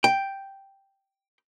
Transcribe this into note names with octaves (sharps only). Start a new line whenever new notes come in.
G5